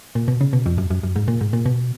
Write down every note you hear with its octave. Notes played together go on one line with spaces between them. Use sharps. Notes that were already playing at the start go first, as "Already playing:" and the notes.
A#2
B2
C#3
B2
F2
F#2
F#2
F#2
G#2
A#2
G#2
A#2
B2